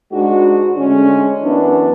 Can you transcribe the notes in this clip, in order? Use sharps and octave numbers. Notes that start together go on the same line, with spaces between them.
G#2 G#3 D4 F#4
D2 D3 G#3 C#4
F#2 E3 B3 D4